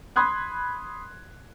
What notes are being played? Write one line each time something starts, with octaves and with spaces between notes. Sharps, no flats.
B5 C6 D#6 F#6 G#6